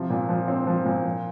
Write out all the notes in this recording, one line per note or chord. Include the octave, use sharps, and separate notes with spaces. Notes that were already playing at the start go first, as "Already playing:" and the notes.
Already playing: C3 F3
A#2
F3
C4
F3
A#2
F3